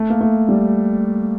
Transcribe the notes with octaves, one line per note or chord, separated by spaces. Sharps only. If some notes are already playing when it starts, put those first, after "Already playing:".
Already playing: A3
A#3
A3
G3